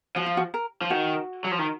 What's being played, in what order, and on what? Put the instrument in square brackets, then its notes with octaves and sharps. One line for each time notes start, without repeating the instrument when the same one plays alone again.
[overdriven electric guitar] F3 [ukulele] F#4
[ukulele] F4
F#4
A#4
[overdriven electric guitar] F3
[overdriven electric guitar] D#3 [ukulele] F#4
[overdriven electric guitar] F#3
F3
D#3